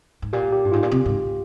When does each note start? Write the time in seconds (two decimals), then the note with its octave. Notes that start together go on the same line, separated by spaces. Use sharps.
0.22 G#2
0.33 A#2 G4
0.52 G4
0.65 G2
0.72 G#2 F4
0.83 A#2
0.91 C3
1.06 G#2